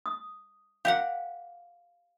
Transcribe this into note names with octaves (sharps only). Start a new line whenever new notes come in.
D#6
G4 A#4 F5 F#5